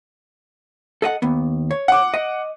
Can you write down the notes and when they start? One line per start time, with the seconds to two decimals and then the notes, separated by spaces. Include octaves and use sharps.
1.02 A4 D#5 F#5
1.22 D#2 B3
1.71 C#5
1.88 F#5 D6
2.14 D#5